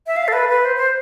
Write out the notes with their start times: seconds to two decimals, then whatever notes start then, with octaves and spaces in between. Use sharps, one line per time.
0.07 E5
0.16 F5
0.28 A4
0.33 B4
0.49 B4
0.65 C5
0.77 C5